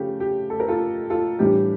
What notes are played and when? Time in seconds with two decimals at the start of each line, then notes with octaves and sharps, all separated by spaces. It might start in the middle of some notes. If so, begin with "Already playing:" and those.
Already playing: C#3 F3 A3 G4
0.20 G4
0.50 A4
0.60 A#4
0.68 F4 A4
1.10 F4 A4
1.39 A2 E3 G3 D4 G4